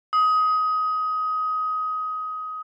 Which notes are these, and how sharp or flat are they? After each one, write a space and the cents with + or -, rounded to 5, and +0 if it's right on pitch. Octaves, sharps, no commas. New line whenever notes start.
D#6 +20